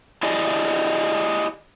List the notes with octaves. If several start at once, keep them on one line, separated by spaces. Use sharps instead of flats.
E4 G4 G#4 D5 D#5